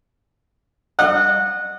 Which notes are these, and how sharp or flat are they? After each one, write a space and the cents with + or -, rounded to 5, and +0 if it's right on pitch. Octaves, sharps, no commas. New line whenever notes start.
D#5 -45 F#5 -20